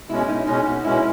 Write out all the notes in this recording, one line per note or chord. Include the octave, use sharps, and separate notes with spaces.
B2 G#3 C#4 E4
E4
D#4
B2 G#3 C#4 D#4
F#4
B2 G#3 C#4 E4